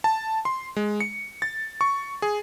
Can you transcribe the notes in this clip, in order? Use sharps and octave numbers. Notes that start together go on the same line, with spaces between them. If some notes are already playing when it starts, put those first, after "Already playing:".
A5
C6
G#3
C#7
A6
C#6
G#4